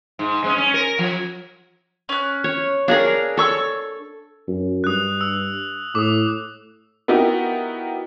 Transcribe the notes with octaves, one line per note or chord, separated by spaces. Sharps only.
G#2
G#3 C4 C#4
C#4
A#4
F3
C#4 F#6
C#5
D4 G#4 A#4 C#5 F5
A4 C#5 C#6 E6
F#2
G2 D#6 F#6
E6
A2 D6 D#6
B3 D#4 E4 F#4 G4 A#4